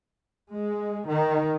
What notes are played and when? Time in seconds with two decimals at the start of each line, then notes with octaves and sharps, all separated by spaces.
0.54 G#3
1.09 D#3